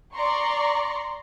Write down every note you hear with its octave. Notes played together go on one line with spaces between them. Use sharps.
D5 A#5 C6 C#6